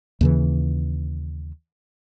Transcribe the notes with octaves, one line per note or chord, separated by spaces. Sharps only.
D#2 C#3 E3